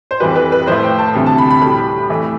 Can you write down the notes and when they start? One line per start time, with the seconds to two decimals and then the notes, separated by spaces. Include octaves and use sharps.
0.11 C5
0.20 F2 E3 G3 B4
0.36 B4
0.52 B4
0.67 A2 F3 A3 C5
0.83 G5
0.99 A5
1.15 D2 C3 E3 G3
1.26 A5
1.38 B5
1.51 B5
1.61 A2 G3 B5
2.09 F2 E3 A3